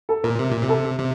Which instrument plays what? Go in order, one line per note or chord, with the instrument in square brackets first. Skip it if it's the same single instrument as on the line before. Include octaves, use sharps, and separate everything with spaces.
[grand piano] A4
[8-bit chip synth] A#2 [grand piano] A#4
[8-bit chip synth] C3
A#2
C3
[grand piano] A4
[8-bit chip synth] C3